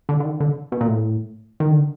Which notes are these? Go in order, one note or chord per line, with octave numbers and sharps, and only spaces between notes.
D3
D3
D#3
D3
B2
A#2
A2
D#3
D3